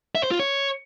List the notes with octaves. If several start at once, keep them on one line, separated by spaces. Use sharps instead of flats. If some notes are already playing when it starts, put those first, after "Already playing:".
E5
C5
F4
C#5